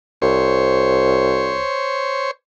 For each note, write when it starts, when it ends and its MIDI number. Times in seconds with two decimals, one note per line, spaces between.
0.22 1.63 36
0.22 2.31 72
0.22 2.31 73